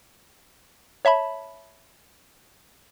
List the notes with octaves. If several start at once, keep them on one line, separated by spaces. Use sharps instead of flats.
C#5 E5 A5 B5